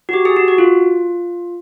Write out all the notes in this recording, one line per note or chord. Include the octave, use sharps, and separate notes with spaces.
F#4
G4
G#4
F#4
F#4
F4